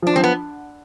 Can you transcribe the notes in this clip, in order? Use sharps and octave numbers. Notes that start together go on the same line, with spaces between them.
F3 D4
F3 C4
B3